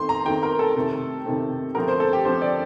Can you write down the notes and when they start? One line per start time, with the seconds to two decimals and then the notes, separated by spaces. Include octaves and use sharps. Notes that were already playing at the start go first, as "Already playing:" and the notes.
Already playing: D#3 A3 C4 C6
0.09 A#5
0.26 D#3 A3 C4 G5
0.43 A#4
0.59 A4
0.76 C3 D#3 A3 C4
1.25 C3 D#3 A3 C4
1.75 D3 F3 A3 C4 A#4
1.88 C5
2.00 A4
2.13 G4
2.25 D3 F3 A3 C4 C5
2.42 D5